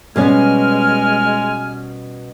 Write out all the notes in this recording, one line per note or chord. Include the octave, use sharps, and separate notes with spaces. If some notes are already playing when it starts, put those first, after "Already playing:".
B2 G3 G#3 C#4 G#5 F6